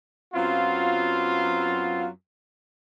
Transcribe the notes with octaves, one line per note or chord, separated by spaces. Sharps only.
F#2 F#3 B3 C4 F4